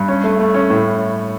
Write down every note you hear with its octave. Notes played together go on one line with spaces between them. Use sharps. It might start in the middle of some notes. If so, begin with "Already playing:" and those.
Already playing: G2
C#4
A3
A3
C#4
A2